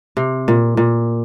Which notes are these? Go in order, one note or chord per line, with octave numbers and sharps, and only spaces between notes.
C3
A#2
A#2